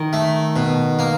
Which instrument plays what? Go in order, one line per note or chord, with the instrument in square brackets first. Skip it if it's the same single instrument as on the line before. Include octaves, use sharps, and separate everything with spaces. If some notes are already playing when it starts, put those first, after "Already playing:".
Already playing: [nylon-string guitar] D#3
[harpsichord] A3
B2
A#3